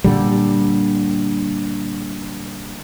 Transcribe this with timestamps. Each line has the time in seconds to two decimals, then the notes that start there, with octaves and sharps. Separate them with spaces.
0.04 A#2 D3 G3